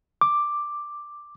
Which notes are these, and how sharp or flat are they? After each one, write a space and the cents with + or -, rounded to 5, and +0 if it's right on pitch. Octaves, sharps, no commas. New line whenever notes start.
D6 +5